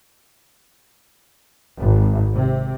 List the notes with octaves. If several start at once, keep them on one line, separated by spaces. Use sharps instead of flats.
G#1
C3